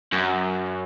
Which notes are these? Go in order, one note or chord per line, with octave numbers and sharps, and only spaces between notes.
F#2